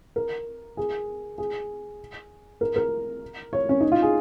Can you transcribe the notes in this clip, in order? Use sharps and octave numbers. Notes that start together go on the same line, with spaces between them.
A#4
G#4
G#4
A#4
A#4
C#5
C#4
D#4
F4
G#4